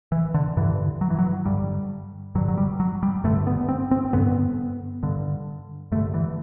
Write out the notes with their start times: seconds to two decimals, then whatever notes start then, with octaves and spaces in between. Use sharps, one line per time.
0.12 E3
0.34 D3
0.57 G2 D3 E3
1.01 F#3
1.10 E3
1.19 F#3
1.46 G2 D3 G3
2.35 G2 F#3
2.38 D3
2.48 F#3
2.57 G3
2.80 F#3
3.03 G3
3.24 G2 D3 A3
3.47 B3
3.69 C4
3.91 C4
4.13 G2 D3 B3
5.03 G2 D3
5.92 G2 A3
5.95 D3
6.14 E3